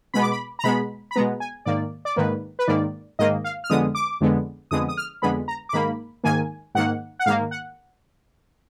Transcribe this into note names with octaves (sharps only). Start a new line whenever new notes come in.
B2 G#3 B3 B5
D6
B5
A#5
B2 G#3 B3 B5
B5
B2 G#3 B3 A#5
G#5
G#2 D#3 A#3 D5
D5
G#2 D#3 A#3 B4
B4
G#2 D#3 A#3 D5
G#2 D#3 A#3 D#5
F5
F6
F2 D3 G#3 B3 D#6
D6
F2 D3 G#3 B3
F2 D3 G#3 B3 D#6
D#6
F6
F2 D3 G#3 B3 B5
A#5
D6
G#2 D#3 A#3 B5
G#2 D#3 A#3 G#5
G#2 D#3 A#3 F#5
F#5
G#2 D#3 A#3 F5
F#5